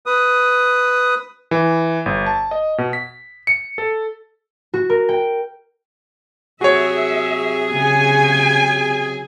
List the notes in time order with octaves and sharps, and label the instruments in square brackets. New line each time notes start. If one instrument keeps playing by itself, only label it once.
[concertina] B4 D#6
[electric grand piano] E3
G1
A5
D#5
B2
B6
C#7
A4
[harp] F#4
A#4
G5
[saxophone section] C3 F#3 G#4 [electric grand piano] F#4 C#5 [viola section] E5
[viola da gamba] C#3 [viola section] G#5